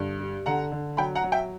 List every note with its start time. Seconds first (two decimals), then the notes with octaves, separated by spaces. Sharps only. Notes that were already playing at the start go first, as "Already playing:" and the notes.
Already playing: G2 D3
0.20 G3
0.46 D3 F#5 A#5
0.72 D3
0.97 F#3 G5 B5
1.15 F#5 A#5
1.23 F#3
1.32 E5 G5